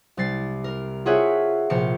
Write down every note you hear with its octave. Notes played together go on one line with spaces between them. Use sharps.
C2 G3 A6 C7
A#4
C4 F4 G#4 C#5 E5 F#5
A#1 C3 A#4 C5 A5 C#7